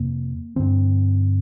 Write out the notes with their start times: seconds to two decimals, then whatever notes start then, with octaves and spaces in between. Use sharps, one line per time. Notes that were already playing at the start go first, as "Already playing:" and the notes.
Already playing: F2 C3 A#3
0.56 G2 D3 C4